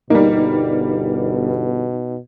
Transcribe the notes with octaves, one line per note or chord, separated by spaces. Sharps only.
G1 B2 G3 A#3 D#4